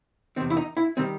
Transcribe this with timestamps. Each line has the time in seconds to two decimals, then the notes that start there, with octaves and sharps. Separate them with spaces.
0.36 E2 C3 D#3 C4
0.50 E4
0.57 D#4
0.77 E4
0.97 D#3 G3 C4